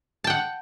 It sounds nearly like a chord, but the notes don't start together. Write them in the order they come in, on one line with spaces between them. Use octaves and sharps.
A5 G5 F#5